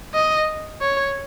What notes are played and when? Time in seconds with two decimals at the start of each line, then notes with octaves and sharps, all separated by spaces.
0.14 D#5
0.81 C#5